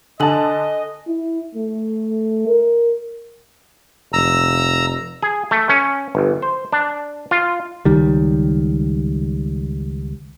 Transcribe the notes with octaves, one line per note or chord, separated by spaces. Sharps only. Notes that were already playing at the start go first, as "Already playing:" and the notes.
D3 A4 D#5 G#5 A5 F#7
E4
A3
A#4
F1 A#5 E6
G#4
A3
C#4
G1
C5
D4
F4
C#2 D#3 G3